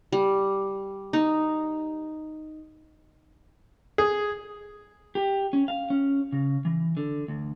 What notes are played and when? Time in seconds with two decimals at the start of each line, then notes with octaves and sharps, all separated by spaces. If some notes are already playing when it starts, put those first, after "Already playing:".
0.12 G3
1.13 D#4
3.98 G#4
5.15 G4
5.53 C#4
5.68 F5
5.90 C#4
6.32 C#3
6.65 E3
6.97 D3
7.28 D2